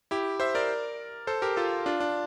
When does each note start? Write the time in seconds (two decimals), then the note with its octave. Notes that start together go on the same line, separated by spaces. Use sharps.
0.11 E4 G4
0.40 C5 E5
0.55 A#4 D5
1.27 A4 C5
1.42 G4 A#4
1.56 F4 A4
1.86 D4 F4
2.00 D4